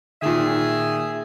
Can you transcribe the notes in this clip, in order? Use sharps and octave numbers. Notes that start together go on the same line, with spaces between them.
A#2 D#3 G#4 E5